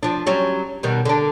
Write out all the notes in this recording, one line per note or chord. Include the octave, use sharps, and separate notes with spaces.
F3 D4
F#3 G3 C#4
B2 D#3 G3
D3 D4